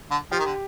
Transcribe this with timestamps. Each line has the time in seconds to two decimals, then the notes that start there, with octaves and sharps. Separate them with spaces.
0.10 D3
0.32 F3 G4
0.39 D#3
0.45 D3